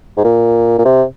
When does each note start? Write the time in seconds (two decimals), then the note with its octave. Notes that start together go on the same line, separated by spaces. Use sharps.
0.18 G#2
0.24 A#2
0.78 A#2
0.85 C3